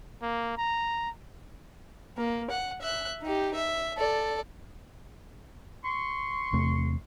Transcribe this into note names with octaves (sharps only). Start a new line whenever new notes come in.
A#3
A#5
A#3
F#5
E5 F#6
D#4 G4
E5
A4 D5
C6 C#6
E2 C3 A3